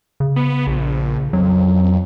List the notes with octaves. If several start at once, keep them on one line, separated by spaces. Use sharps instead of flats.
C#3
B3
A#1
F2 F#3